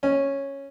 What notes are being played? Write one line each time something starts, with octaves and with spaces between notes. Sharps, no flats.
C#4